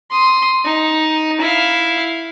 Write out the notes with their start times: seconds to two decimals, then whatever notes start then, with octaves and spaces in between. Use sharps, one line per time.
0.11 C6 D#6
0.65 D#4
1.40 E4 F5